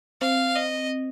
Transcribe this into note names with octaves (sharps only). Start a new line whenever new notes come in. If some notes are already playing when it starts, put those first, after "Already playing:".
C4 F5
D#5